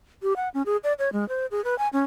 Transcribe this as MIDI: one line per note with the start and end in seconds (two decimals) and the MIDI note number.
0.23 0.36 67
0.36 0.49 78
0.54 0.62 61
0.66 0.77 68
0.84 0.93 74
0.99 1.12 73
1.13 1.27 56
1.29 1.46 72
1.51 1.63 68
1.64 1.77 71
1.79 1.88 80
1.93 2.04 61